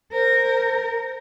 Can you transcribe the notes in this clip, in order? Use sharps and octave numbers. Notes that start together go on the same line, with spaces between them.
A#4 C5